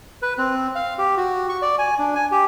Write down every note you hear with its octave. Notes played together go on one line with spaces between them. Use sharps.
B4
C4
F5
G4
F#4
C#6
D5
G#5
D4
G#5
G4